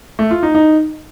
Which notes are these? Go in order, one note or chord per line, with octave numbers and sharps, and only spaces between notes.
A3
F4
D#4
D#4